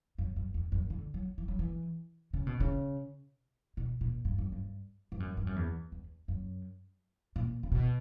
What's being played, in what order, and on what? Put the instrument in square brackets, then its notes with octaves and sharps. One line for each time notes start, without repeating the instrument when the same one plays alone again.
[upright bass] F#2
F#2
E2
F#2
D3
F#3
E3
F#3
E3
C#3
B2
C#3
B2
A#2
G2
F#2
G2
G2
F#2
G2
F#2
E2
E2
F#2
A#2
C#3
B2